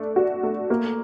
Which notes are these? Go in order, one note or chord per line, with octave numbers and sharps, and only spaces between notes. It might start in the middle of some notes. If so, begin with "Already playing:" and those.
Already playing: A3 D4
F#4
A3
A#3